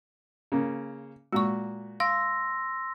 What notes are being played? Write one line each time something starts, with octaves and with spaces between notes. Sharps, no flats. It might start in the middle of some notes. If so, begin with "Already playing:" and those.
C#3 A#3
A#2 G#3 F#4 C#6
F5 C6 E6 A#6